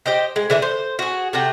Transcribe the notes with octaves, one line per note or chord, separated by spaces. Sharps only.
G4 C5 D#5 G5
G#3
D3 E3 D4 E5
C5
F#4 G#4
C3 A3 F#4 G5